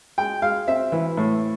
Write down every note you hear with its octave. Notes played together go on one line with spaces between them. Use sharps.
G#3 G5
G#3 F5
C4 E5
E3
A2